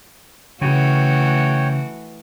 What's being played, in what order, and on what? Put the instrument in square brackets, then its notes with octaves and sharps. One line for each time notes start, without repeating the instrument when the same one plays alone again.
[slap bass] C#3 [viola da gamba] E3 A3 F#4 [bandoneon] C#5 G5